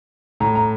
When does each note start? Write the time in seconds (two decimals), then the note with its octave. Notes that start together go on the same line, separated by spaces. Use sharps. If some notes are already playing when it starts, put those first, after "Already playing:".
0.40 A2 A#5
0.55 A#5